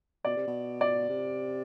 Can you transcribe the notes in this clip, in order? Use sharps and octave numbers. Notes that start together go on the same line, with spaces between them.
B2 D5
C3
B2
D5
C3